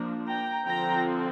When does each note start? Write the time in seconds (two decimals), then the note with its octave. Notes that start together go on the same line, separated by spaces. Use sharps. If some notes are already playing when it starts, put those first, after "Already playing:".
Already playing: F3 A#3 D4
0.28 G5 A#5
0.66 D3 F3 C4 G5 A#5